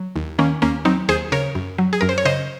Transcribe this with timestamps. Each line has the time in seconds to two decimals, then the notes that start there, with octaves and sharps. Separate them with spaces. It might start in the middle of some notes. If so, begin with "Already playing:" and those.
Already playing: F#3
0.16 D#2
0.39 D#3 A#3 C#4
0.62 D#2 A#3 C#4
0.85 F#3 C4 D#4
1.09 D#2 G#4 C5
1.32 C#3 A#4 C#5
1.55 F#2
1.78 F#3
1.93 G#4
2.01 F#2 A#4
2.09 C5
2.18 C#5
2.25 C#3 C5 D#5